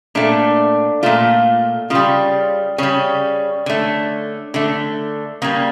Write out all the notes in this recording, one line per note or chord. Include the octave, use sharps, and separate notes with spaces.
A#2 A3 D4
A#2 A3 F4
C#3 G3 F4
C#3 G3 C#4
D3 A3
D3 A3
C#3 G3 A#3